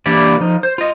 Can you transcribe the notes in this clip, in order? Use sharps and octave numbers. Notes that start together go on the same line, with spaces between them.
E3 A#3 D4 E4 G4 D5
F3 D#4
C5
F4 D#5